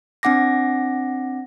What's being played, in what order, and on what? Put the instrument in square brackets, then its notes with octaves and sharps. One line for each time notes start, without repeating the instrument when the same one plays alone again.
[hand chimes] C4 D4 F#5 D6 A#6